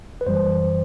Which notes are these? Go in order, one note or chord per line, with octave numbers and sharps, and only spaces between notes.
B4
F#2 E3 G3 C5